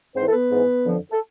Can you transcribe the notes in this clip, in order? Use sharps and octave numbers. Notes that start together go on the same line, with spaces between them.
G#2 E3 C4 C5
A4
B3 B4
G#2 E3
F2 D3 F3
A4